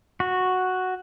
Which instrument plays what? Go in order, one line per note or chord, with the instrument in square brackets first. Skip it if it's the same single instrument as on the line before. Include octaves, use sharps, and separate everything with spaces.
[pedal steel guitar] F#4